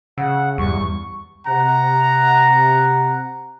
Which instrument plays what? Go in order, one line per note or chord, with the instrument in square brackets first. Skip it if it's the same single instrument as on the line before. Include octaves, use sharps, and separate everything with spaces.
[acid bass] C#3 [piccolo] F#5 [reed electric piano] E6
[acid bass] E2 [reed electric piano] G2 G3 [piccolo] C#6
[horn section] C3 F#5 A#5